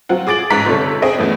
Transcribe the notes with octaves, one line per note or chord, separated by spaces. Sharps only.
F#3 C4 F4 F#5
G#4 D6 A6 D7 F#7
A1 G#2 A#5 B6
G1 C3 F4 A4 C#5
C4 G#4 D#5 D7
E2 F3 A3 B3 C#4